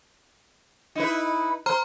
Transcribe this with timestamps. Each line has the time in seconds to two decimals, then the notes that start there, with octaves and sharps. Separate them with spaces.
0.95 D#4 E4 B4
1.66 C5 A#5 F6